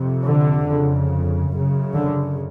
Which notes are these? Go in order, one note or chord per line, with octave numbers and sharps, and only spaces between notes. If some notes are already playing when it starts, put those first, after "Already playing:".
Already playing: F2 C3
D3
F2 C#3
F#2 C#3
D3